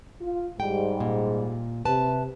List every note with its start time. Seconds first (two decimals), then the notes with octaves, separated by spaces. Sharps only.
0.21 F4
0.60 G#2 G3 G5
1.00 A#2
1.85 C3 B4 A5